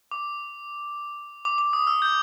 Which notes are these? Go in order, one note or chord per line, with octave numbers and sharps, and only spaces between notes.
D6
D6
D6
D#6
E6
G6